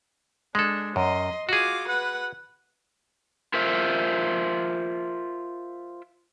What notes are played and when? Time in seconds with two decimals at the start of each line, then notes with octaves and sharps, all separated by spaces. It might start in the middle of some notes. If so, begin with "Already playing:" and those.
0.55 G#3 D4 A4
0.96 F#2 D#5 C6
1.49 F4 F#4 G#4 D6
1.88 B4 F#5
3.54 F4 A#4 C5 E5